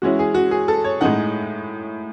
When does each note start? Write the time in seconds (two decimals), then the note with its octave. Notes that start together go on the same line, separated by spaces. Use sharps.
0.02 E3 G#3 C#4 E4 F#4
0.19 G#4
0.35 F#4
0.51 G#4
0.68 A4
0.84 C#5
1.01 A2 G#3 D#4 F#5